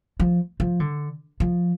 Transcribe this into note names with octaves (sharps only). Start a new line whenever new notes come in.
F3
F3
D3
F3